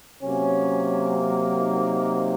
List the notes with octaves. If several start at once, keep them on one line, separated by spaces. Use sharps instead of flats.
C3 F#3 A#3 C#4
D#4